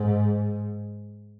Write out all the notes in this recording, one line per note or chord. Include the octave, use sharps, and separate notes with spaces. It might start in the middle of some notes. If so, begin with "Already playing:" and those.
Already playing: G#2